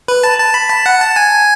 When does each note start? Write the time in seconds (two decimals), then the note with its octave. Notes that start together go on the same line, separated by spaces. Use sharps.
0.08 B4
0.24 A5
0.39 A5
0.54 B5
0.70 A5
0.86 F#5
1.01 A5
1.16 G#5